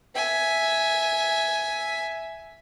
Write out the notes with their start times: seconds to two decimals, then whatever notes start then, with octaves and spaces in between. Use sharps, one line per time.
0.15 E5 G#5